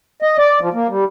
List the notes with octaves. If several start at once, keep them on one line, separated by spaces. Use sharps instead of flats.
D#5
D5
F3
A#3
G3